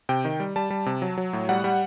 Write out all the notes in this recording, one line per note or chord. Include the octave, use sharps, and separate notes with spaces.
C3 G5
D#3
G3
G3 A5
G3
C3
F#3
F#3
A2
G3 F#5
G3